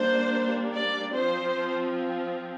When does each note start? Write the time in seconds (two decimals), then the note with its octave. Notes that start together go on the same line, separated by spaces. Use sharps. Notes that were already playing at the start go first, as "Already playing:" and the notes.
Already playing: G3 A#3 D4 C5
0.74 D5
1.14 F3 C4 C5